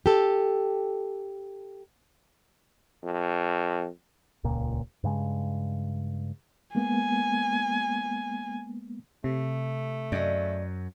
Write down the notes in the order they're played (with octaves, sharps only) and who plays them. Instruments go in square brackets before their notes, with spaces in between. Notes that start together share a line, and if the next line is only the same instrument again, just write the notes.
[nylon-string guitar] G4 A4
[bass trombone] F2
[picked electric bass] D#1 C#2 A#2
G2 C#3 G#3
[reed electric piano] G#3 A#3 B3 [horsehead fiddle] G#5
[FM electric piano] C3 [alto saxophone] A3
[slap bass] F#2 [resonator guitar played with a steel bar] D5 D#5